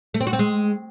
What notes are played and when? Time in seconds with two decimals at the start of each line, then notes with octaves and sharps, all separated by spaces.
0.14 A3
0.21 C4
0.27 F#4
0.33 C4
0.39 G#3